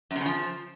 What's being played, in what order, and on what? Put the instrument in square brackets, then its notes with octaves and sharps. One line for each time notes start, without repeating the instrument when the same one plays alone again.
[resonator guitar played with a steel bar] F#2
C3
C#3
F3